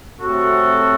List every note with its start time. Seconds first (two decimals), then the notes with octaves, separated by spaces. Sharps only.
0.20 C3 F#3 A3 C4 F#4 A4